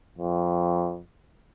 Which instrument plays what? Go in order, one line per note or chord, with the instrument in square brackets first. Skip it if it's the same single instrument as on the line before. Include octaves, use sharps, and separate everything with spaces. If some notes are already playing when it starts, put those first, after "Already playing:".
[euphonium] F2